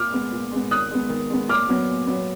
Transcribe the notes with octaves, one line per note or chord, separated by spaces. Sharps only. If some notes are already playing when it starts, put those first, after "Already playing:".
Already playing: A#2 D6 F6
G#3 B3
A#2
G#3 B3
D#3 D#6 F#6
G#3 B3
D#3
G#3 B3
A#2 D6 F6
F#3 B3
A#2
F#3 B3